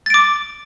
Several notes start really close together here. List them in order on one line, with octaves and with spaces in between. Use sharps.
A6 D7 D6